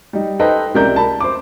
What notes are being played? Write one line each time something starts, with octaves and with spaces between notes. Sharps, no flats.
G3 D#4
D#4 A4 B4 C5 D#5 G5
C#2 C3 A#4 D5 E5 G6
A5 B5
C5 D6